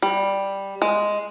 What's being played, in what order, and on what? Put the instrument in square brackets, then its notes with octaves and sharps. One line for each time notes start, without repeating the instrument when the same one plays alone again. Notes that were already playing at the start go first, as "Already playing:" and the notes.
[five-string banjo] G3
G#3